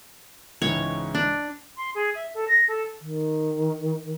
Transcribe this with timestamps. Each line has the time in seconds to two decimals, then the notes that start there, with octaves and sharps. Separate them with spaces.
0.62 C#2 G#2 E3 C#5
1.15 D4
1.77 C6
1.94 G#4
2.15 E5
2.34 A4
2.48 A#6
2.68 A4
2.99 D#3